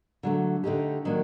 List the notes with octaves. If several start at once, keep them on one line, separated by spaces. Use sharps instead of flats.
D3 F#3 A3
D3 A3 D#4 G4
D#3 F#3 A#3 D4